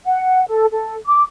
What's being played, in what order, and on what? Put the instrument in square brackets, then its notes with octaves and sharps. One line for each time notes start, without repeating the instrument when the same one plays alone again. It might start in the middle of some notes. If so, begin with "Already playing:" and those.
[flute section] F#5
A4
A4
D6